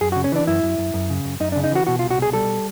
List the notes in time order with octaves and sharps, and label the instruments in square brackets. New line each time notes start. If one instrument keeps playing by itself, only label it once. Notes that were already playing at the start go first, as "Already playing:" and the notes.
[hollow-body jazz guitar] F#2 G#4
F#4
C#3
C#4
E3 D4
F#2 E4
F#2
F#2
F#2
C#3
F#2
F#2 D#4
D4
C#3
D#4
E3 F#4
B2 F#4
F4
C2
F#4
B2 G#4
G3 A4